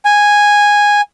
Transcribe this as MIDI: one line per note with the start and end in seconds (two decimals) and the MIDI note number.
0.05 1.01 80